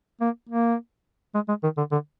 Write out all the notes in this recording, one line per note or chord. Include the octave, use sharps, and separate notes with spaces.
A#3
A#3
G#3
G#3
D#3
D3
D3